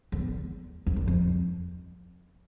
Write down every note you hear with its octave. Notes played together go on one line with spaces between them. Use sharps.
F2
E2
F2
F#2
F2